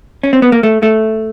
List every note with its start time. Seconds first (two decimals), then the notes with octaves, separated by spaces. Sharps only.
0.23 C#4
0.33 C4
0.42 B3
0.52 A#3
0.63 A3
0.83 A3